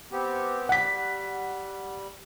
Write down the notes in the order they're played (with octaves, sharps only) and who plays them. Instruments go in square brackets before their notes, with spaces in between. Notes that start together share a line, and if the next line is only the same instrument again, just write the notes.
[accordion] B3 C4 G4
[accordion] G3 [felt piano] F#5 B6